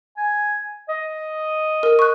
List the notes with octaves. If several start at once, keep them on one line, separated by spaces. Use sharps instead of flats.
G#5
D#5
A#4
C#6 F#6